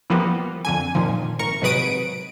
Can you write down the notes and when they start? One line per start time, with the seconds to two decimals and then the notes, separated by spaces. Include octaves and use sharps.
0.10 E3 F3 G3 A#3 B3
0.65 F2 D3 G#5
0.95 A#2 D#3 F3
1.39 G#1 A#4 C#6
1.62 G#2 C3 F#3 B4 D#6 D7